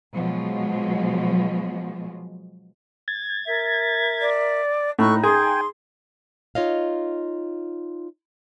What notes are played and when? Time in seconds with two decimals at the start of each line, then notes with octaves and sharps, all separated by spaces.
0.14 B2 F3 F#3 G#3
3.08 G#6 A6
3.46 A#4 E5
4.21 D5
4.99 A2 D#4 A4 C#6 E6 F#6
5.23 G#4 G5 G#5 C6
6.55 D#4 F4 C#5 D#5 F5